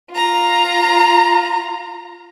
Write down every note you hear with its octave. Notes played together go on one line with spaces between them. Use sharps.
F4 A#5